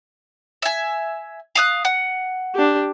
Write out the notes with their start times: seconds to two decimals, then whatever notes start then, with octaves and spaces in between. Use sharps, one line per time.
0.62 E5 G#5
1.55 F5 D#6 F#6
1.85 F#5
2.54 D4 G4